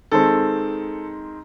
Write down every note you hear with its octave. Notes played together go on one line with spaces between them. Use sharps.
D#3 G#3 C4 A4